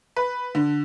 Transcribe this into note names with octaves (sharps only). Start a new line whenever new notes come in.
B4
D3